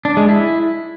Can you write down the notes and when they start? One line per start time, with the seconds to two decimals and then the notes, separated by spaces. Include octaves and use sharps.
0.05 D4
0.17 G#3
0.29 E4